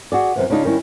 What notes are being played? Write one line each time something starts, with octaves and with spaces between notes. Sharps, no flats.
F#4 G#4 D5
F#2 C3 E3
C#3 D4 D#4 F4
D#3 G3 C#4 E4